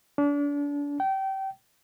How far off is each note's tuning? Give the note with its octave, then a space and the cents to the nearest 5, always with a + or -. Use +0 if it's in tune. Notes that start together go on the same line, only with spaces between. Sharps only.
D4 -35
G5 -25